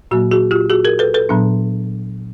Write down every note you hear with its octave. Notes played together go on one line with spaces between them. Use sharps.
A#2 F#3 A#3 F#4
F#4 G#4
F4 G4
F#4 G#4
G#4 A#4
A4 B4
A4 B4
A#2 F#3 B3 D4